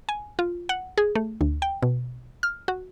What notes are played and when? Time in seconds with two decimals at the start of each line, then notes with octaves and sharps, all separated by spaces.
0.09 G#5
0.39 F4
0.69 F#5
0.98 G#4
1.15 A3
1.41 D2
1.62 G5
1.83 B2
2.43 F6
2.68 F#4